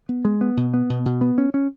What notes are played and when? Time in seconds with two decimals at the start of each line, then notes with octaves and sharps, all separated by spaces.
0.09 B3
0.25 G#3
0.41 B3
0.57 B2
0.74 B3
0.90 B2
1.06 B2
1.21 B3
1.38 C#4
1.54 C#4